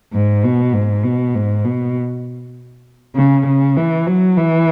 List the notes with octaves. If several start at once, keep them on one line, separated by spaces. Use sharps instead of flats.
G#2
B2
G#2
B2
G#2
B2
C#3
C#3
E3
F#3
E3